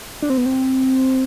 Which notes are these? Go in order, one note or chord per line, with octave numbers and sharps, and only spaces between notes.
D4
C4
B3
C4